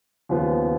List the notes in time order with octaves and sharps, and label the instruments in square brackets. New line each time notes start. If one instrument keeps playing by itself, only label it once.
[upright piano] D#2 C#3 F3 B3